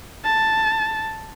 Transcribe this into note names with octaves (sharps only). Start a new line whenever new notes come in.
A5